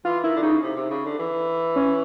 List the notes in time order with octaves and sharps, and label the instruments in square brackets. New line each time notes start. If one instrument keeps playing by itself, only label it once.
[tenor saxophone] E3 [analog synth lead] F4
[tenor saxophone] D#3 [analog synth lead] E4
[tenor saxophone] D3
[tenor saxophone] C#3 [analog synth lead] D#4
[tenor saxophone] C3
C3
C#3
D3
E3
[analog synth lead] C#4